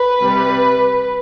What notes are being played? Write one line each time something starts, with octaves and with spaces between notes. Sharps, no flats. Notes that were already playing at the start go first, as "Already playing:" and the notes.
Already playing: B4
C3 G3